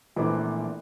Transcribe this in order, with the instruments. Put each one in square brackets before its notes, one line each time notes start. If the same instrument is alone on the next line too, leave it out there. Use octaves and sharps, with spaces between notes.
[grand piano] A#1 E3 F3 A3 B3 D6